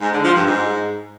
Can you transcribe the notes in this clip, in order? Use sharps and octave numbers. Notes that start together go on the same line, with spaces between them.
G#2
D3
F3
G2
G#2